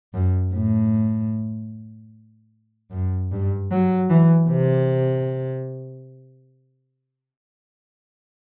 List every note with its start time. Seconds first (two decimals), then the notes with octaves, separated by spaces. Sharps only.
0.14 F#2
0.53 A2
2.91 F#2
3.32 G2
3.71 F#3
4.10 E3
4.50 C3